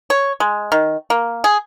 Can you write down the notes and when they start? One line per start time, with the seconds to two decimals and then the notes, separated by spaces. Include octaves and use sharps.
0.10 C#5
0.40 G#3
0.72 D#3
1.10 A#3
1.44 G#4